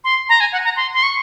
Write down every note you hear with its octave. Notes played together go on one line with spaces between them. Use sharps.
C6
A#5
G#5
F#5
A#5
C6
C6
C#6